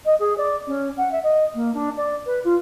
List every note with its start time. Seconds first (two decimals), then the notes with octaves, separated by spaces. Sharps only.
0.05 D#5
0.19 G#4
0.37 D5
0.67 C#4
0.97 F#5
1.11 E5
1.23 D#5
1.54 A#3
1.74 D4
1.97 D5
2.26 B4
2.44 F4